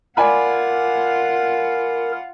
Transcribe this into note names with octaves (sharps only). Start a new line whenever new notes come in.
F4 A#4 D5 F#5 G#5 B5